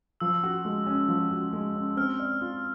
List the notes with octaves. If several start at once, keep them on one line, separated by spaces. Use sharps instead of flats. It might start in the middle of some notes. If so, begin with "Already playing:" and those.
F3 E6
F#4
G#3
C#4
F3
F#4
G#3
C#4
C4 F6
D5
F4